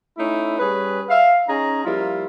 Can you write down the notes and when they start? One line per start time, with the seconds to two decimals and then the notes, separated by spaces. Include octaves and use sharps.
0.18 A3 C#4 D#4 E4
0.59 G3 C#4 G#4 B4
1.09 E5 F5
1.47 C#4 D#4 G#4 A#5
1.85 F3 G3 A#3 E4 F4